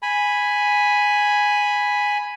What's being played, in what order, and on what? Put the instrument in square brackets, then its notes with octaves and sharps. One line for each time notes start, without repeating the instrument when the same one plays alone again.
[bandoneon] G#5 B5